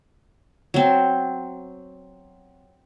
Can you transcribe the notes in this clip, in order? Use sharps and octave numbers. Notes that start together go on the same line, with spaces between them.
F#3 C4